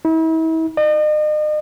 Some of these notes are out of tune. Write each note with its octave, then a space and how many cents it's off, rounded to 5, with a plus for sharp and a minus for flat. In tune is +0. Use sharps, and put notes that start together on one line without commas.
E4 -40
D#5 -40